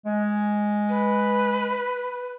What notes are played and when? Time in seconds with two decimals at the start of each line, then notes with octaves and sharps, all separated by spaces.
0.06 G#3
0.89 B4